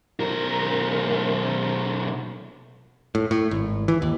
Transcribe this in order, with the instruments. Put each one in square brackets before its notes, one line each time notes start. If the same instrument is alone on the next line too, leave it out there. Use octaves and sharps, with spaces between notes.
[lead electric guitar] B1 A#4
[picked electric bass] A2
A2
G#1
E3
D#2